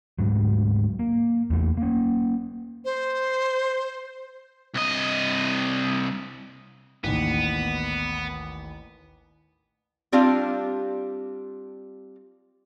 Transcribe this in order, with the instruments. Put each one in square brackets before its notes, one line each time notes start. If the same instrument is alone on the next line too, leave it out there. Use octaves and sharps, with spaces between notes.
[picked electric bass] D2 G#2 F#3
A#3
E2 A3
A#3 C#4
[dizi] C5
[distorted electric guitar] C2 D#5
[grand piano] A1 D#2 [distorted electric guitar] B3
[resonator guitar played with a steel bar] G3 C4 D4 F4 G4 F5